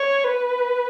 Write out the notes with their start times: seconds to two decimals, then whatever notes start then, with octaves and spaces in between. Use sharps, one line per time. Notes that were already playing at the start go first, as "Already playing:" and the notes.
Already playing: C#5
0.24 B4